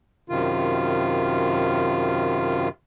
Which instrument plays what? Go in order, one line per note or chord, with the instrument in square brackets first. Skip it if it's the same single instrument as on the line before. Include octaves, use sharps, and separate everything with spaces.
[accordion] F#2 C3 D#3 F4